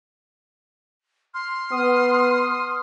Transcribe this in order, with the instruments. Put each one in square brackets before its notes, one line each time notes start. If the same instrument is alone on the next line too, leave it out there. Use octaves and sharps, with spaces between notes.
[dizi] C6 [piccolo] F6
[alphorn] B3 [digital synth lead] D#6